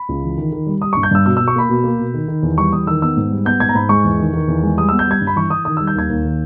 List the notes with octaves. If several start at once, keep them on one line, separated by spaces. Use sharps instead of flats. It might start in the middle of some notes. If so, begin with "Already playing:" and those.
Already playing: B5
C#2
E3
D#3
D#3
G3
G3 D#6
G2 C#6
G6
G2 E6
B2 E6
B2 E6
C#6
A#3 B5
B2
A#3
B2
D#3
D#3
E2
G3 C#6
E2 D#6
D#3 E6
B3 E6
G#2
G3
B3 G6
G#2 G#6
A#5
G#2 B5
G#3 C#6
E2
D#3
D#3
E2
G#3
G3 D#6
B3 E6
G6
G3 G#6
G2
B5
E3 C#6
E3 D#6
D#3 D#6
G3 E6
G6
D#2 G#6
D#2
D#3